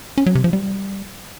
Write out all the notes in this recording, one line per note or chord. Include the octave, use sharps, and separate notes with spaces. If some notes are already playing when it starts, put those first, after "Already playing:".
C#4
F#3
C3
F3
G3